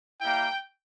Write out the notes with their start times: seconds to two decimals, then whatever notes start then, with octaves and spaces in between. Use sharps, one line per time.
0.21 G3 A#3 E4 G5